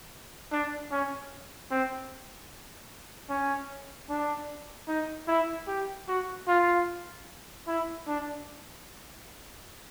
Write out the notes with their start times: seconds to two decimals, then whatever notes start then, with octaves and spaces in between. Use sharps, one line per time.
0.52 D4
0.91 C#4
1.71 C4
3.29 C#4
4.09 D4
4.88 D#4
5.28 E4
5.67 G4
6.08 F#4
6.48 F4
7.67 E4
8.07 D4